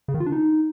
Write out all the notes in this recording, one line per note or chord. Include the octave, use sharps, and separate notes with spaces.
C#3
D#3
F4
D4
D#4